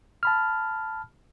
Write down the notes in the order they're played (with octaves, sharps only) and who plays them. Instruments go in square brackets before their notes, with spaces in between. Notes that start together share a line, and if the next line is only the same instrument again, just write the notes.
[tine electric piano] A5 B5 F6